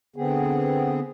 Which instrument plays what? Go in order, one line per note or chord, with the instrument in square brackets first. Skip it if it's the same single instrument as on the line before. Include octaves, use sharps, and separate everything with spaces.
[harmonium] D3 B3 C4 G#4